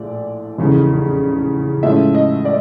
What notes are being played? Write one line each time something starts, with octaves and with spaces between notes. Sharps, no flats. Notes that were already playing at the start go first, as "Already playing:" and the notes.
Already playing: A#1 A2 F3 D5
F1 E2 C#3
A2 F3 G#3 C#4 E5
D#5
D5